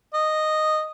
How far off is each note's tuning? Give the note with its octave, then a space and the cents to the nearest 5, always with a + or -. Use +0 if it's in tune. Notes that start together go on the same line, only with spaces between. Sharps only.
D#5 -5